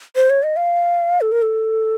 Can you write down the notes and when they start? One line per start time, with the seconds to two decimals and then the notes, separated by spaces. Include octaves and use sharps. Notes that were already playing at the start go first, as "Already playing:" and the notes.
0.16 C5
0.30 C#5
0.43 D#5
0.56 F5
1.21 A4
1.32 A#4
1.42 A4